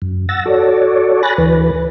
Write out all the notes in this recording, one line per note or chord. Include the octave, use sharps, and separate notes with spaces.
F#2
F#5 E6 A6 A#6
F#4 A4 C#5 D5
G#5 B5 F#6 A6 A#6
D2 E3 B4